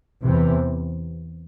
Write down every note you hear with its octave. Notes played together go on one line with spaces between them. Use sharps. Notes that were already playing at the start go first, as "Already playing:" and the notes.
E2 C3 E3